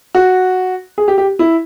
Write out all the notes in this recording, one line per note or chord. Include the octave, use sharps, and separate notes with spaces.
F#4
G#4
G4
G4
E4